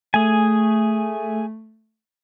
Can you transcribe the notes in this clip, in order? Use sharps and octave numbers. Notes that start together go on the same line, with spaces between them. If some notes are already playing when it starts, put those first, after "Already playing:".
A3 G#4 G#5